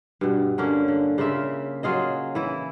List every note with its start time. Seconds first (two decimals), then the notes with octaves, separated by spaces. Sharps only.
0.21 G2 B2
0.58 D3 A#3 C#4
0.88 D3
1.18 C#3 A#3 F4 E5
1.83 F#3 F4 G#4 D#5
2.35 E3 E4